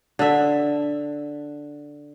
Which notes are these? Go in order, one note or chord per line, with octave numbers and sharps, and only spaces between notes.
D3 E5